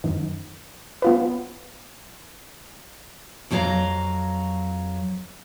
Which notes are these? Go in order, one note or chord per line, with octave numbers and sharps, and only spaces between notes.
F#2 D#3
B3 F4 B4
F2 F#3 D4 G4 F5 A#5